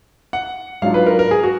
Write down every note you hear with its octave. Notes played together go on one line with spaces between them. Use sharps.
F#5
G#2 F#3 D4 F4 F5
B4
A#4
A#4
G#4
F#4